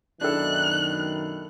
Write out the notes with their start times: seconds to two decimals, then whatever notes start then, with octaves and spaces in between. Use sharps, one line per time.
0.21 F#2 B2 D#3 D4 E4 A4 F#6